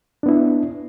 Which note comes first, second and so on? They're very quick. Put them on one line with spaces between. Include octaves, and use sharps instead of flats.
D4 B3 E4